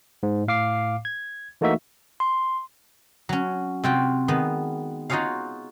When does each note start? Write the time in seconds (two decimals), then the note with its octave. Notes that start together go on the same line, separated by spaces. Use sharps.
0.23 G#2
0.48 A2 F5 D6 C7
1.05 G#6
1.61 E3 A3 A#3 D#4 F#4 E5
2.20 C6
3.29 F#3 C#4
3.84 C3 C4 F4 F#4 G5
4.28 D#3 G#3 B3
5.10 D#4 F4 F#4 G#4 C#5 F5